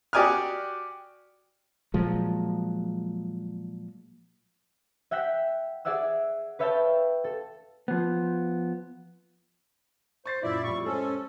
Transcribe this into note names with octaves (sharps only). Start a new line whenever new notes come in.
F#4 G4 D5 G#5 D#6 F6
A#2 F3 F#3 G#3
E5 F#5 G5 F#6 B6
G#4 D5 E5 F#5 E6
B4 C#5 E5 F5 G5 A5
A4
F3 B3
C5 C#6 A6 C7
F#2 A#2 E4 D5 E5
F2 A2 G3 C#6
G#3 C#4 G4 A4 C5